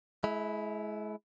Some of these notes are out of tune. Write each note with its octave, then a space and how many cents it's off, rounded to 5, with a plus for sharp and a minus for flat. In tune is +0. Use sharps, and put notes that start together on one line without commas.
G#3 +35 E4 +0